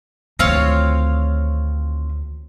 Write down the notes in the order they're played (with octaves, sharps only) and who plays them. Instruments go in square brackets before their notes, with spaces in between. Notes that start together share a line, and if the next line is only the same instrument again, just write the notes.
[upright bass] D2 D#3 [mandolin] C4 F4 C#5